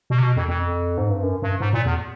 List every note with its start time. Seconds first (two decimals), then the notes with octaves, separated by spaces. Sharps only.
0.10 B2
0.18 C3
0.23 B2
0.36 F2
0.48 F2
0.98 G#2
1.09 G2
1.23 F#2
1.42 G2
1.60 G#2
1.73 A#2
1.85 E2